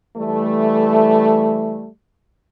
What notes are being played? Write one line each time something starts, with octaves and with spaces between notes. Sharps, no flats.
E3 G3 A3